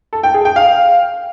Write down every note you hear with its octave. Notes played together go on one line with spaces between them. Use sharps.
A4
G5
G#4
G5
F5